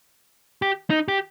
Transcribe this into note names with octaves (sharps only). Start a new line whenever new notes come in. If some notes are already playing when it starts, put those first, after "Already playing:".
G4
D#4
G4